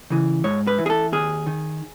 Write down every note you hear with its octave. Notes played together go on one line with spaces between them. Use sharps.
C#3 E3
G#2 C#5
B4
E3
G#4
A4
D#2 G#4
D#3